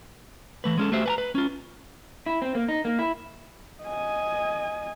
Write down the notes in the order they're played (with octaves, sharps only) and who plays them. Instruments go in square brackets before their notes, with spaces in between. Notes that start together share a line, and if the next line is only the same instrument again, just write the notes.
[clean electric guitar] E3 A3 B4
G#3 C#4 A4
A3 F#4 G4 C5 E5
B4 G#5 A#5
B4
C#4 F4
[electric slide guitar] E4
C4
A#3
D#4
A#3
E4
[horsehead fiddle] D#5 G#5